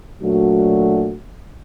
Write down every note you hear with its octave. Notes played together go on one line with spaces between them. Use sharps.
A#2 F#3 A3 D4 F#4